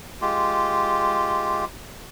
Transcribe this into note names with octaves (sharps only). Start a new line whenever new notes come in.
G#3 F4 G4